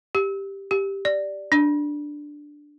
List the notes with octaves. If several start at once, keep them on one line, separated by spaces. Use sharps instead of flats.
G4
G4
D5
D4